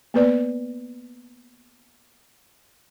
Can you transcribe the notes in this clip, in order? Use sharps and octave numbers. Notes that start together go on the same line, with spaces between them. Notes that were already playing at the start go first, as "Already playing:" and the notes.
A#3 B3 B4 D5